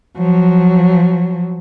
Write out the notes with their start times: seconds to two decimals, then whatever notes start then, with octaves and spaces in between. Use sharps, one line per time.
0.17 F3 F#3